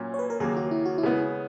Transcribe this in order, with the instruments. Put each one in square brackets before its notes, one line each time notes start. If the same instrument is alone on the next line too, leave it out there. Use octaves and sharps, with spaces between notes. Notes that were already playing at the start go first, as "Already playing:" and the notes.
Already playing: [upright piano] A#2 F#3 C#4
[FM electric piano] C#5
B4
A#4
[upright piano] D#2 C#3 F#3 A#3 [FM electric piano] G#4
[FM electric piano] F#4
E4
F#4
E4
[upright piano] C#3 G#3 B3